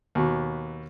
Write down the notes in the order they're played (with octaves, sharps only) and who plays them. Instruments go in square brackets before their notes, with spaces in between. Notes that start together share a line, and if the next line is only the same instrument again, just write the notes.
[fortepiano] D#2 B2